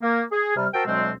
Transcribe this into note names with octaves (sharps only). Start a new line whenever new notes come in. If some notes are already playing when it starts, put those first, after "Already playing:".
A#3
G#4
C3 G3 F6
F#4 A#4 C5 G5 A5 E6
D2 B2 F#3 G#3 C4